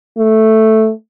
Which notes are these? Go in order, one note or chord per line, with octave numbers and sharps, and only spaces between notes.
A3